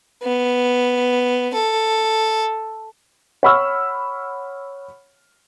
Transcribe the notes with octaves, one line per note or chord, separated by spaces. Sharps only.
B3
A4
C#5 F#5 B5 C#6 E6 F6